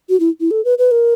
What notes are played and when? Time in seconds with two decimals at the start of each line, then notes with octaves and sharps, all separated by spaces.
0.09 F#4
0.20 E4
0.41 E4
0.51 A4
0.65 B4
0.78 B4
0.91 A#4